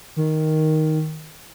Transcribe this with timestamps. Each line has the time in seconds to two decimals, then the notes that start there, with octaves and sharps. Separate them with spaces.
0.16 D#3